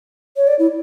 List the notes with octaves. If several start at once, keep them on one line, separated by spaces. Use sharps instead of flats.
C#5
D5
E4